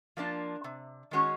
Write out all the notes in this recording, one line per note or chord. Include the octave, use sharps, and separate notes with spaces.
F3 A#3 D4 F4
C3
D#3 G#3 C#4 F#4